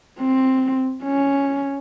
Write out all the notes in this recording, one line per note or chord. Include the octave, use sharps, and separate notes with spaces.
C4
C#4